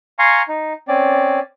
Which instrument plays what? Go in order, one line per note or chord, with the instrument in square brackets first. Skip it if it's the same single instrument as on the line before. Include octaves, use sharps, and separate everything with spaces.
[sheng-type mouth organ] F5 G#5 A#5 C6 C#6
D#4
C4 C#4 D5